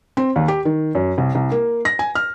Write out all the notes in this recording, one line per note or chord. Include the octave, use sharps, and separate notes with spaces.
C4
D#2
G4
D#3
F#2
C2
C2
A#3
A#6
G#5
F6